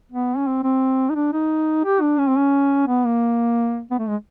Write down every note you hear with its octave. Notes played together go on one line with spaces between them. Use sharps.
B3
C#4
C4
C4
D#4
D4
D#4
G4
D4
C#4
C4
C#4
B3
A#3
B3
A3
G#3